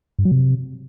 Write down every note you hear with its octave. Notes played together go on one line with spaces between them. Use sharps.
G2
F#3
C3